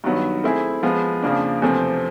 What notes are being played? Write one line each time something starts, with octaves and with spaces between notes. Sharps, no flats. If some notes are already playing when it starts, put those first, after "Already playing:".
G2 D#3 F#3 B3
A3 C4 E4 G#4
F3 G#3 B3
F2 C#3 F3 A#3 D4
E2 C3 F3 A3 C4